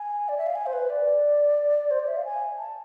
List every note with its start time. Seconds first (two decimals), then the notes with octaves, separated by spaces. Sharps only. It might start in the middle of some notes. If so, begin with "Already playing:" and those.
Already playing: G#5
0.29 D5
0.38 E5
0.47 F5
0.55 G#5
0.66 C5
0.73 B4
0.90 D5
1.91 C5
2.00 D5
2.08 E5
2.17 F5
2.25 G#5
2.58 A5